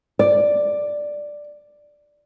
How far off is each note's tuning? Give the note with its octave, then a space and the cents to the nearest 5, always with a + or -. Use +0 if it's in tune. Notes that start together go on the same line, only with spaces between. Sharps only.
D5 +5